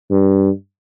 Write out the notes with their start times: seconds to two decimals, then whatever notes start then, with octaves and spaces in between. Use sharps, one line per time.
0.10 G2